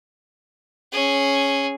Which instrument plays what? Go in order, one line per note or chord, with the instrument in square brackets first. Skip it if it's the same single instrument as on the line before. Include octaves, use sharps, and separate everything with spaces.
[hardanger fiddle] C#4 G#4